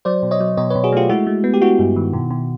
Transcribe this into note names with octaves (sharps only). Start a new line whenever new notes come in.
F#3 C5 D5
B2
C#5 D#5
F#3
B2 C#5 D#5
B4 C#5
B2
F#4 G#4
A3 F4 G4
G#3 E4 F#4
G#3
B3
G4
B3 E4 F#4
G2
D#3
B2
B2